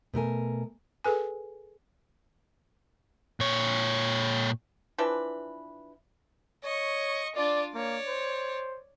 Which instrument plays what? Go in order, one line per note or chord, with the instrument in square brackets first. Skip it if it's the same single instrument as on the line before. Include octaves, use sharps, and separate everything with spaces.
[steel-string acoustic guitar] B2 A3 A#4 G#5
[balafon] G#4 A4 B4 G#5
[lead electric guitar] A#2 C#5
[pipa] E3 F3 D4 B4
[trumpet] C#5 [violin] D#5 C#6
[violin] D4 F4 [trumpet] D5
[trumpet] A#3 [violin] C#5 D5
[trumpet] C5